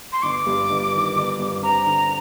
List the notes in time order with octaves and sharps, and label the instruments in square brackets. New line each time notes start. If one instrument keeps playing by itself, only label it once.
[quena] C6
[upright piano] G1 [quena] D6
[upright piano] G2
G1
D#3
G1
G2
[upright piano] C4 [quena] A#5
[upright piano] D3